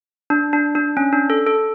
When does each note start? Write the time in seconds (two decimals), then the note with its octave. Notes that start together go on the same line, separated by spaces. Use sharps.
0.30 D4
0.53 D4
0.75 D4
0.97 C#4
1.13 D4
1.30 A4
1.47 A4